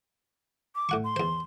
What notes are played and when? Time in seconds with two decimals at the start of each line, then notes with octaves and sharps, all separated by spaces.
0.75 D6
0.89 A2 F#5 C#6
1.04 C6
1.16 E2 C5